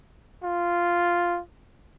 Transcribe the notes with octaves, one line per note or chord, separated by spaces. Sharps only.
F4